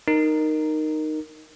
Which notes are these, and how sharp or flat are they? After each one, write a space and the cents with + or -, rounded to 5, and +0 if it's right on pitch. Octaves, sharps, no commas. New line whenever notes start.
D#4 -10 A#4 +0